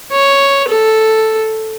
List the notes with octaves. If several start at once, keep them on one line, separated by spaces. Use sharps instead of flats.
C#5
A4